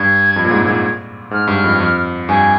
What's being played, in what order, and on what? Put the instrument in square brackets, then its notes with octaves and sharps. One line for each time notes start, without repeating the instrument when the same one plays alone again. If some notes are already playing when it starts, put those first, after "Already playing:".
Already playing: [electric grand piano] G2 [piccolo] G#6
[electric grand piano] F2
A#2
G#2
G#2
A#2
[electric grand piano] G#2 [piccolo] F6
[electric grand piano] G2
F2
F2
[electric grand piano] G2 [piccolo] G#5